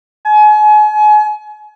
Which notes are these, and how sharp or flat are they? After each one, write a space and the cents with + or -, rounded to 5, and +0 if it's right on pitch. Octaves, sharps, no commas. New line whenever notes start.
G#5 +35